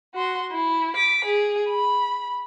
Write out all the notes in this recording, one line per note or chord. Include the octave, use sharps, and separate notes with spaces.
F#4 C6
E4
D6 B6
G#4
B5